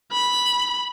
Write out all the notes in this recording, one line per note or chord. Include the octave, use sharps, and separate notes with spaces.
B5